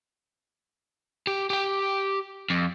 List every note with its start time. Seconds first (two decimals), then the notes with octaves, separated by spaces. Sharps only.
1.27 G4
1.50 G4 G5
2.50 F2